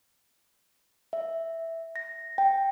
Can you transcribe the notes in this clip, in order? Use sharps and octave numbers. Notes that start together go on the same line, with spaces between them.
E5
A#6
G5